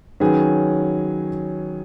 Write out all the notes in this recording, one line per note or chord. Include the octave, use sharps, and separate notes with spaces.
D#3 F#3 C#4 G#4 B4